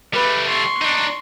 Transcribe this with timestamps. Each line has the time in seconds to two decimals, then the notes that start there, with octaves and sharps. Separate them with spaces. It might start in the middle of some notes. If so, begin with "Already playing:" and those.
0.14 G3 A3 B4
0.48 C6 C#6
0.82 D4 D#4